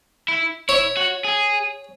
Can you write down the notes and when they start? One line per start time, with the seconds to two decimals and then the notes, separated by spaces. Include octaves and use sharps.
0.28 E4
0.69 E4 C#5
0.97 F#4
1.25 G#4